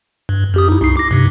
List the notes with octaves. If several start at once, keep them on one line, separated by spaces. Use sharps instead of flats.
G2
F#2 G4 D#6
D#4 E4
C2 D#4 C7
D6 A#6
G2 C3